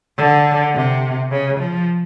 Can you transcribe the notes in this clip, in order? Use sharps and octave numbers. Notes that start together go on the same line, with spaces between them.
D3
C3
C#3
F3